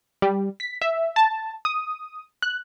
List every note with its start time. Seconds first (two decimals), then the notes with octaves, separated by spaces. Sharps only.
0.22 G3
0.60 B6
0.82 E5
1.16 A5
1.65 D#6
2.42 F#6